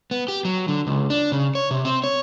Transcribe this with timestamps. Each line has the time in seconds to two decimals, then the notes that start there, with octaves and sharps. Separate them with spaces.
0.11 B3
0.28 G4
0.45 F#3
0.68 D3
0.87 C#2
1.10 D4
1.32 C#3
1.55 C#5
1.71 C3
1.85 C4
2.03 C#5